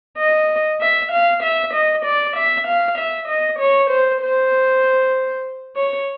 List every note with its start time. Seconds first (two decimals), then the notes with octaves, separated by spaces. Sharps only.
0.18 D#5
0.81 E5
1.12 F5
1.43 E5
1.73 D#5
2.05 D5
2.36 E5
2.67 F5
2.98 E5
3.28 D#5
3.59 C#5
3.90 C5
4.22 C5
5.76 C#5